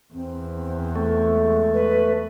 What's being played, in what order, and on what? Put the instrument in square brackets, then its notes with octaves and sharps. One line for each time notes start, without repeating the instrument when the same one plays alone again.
[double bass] E2 [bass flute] C4
[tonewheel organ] A3
[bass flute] G#3
[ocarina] B4